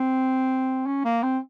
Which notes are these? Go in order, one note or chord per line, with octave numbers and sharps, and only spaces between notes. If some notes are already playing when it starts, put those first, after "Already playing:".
Already playing: C4
C#4
A#3
C4